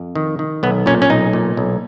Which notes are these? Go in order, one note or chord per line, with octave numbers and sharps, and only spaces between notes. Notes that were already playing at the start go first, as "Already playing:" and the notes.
Already playing: F2
D#3
D#3
B1 B3
A#2 C#4
C#4
B1 D#4
A#2
B1